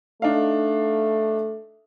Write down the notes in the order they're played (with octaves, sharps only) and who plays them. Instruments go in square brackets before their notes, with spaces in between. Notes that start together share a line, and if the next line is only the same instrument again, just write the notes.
[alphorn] A3 [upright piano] D4 D#4 F5